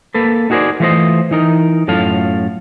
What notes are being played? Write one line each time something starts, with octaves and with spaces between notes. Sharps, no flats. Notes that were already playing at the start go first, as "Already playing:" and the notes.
A#3 A4 B4
D#4 F#4 G#4 A#4 C5 D5
E3 A3 F4 B4 C5 D#5
E3 D#4 A#4
F#2 A2 F4 A4 F5